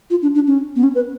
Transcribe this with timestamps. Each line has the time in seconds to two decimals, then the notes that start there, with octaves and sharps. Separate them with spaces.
0.10 F4
0.22 D4
0.35 D4
0.47 C#4
0.76 B3
0.83 C#4
0.95 B4